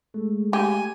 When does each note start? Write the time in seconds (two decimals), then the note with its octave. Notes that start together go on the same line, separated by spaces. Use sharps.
0.14 G#3 A3
0.53 G4 G#5